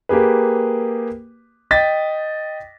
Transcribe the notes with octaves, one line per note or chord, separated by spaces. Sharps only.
A#3 G4 G#4 B4
D#5 G5 A6 B6